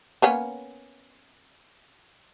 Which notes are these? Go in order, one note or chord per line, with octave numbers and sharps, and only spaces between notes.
A#3 B3 C#4